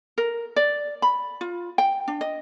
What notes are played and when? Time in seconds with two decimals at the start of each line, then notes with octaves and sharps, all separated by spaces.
0.18 A#4
0.56 D5
1.02 B5
1.41 F4
1.78 G5
2.08 D4
2.21 D#5